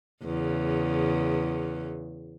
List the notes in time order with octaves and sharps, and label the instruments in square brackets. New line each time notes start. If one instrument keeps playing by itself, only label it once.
[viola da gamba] E2 C#3